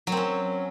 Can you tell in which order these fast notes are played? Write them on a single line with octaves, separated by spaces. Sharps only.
F#3 C4 C#4